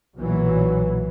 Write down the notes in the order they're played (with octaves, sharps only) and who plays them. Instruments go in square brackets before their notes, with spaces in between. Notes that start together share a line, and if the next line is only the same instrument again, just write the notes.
[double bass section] B1 A#2 E3 F#3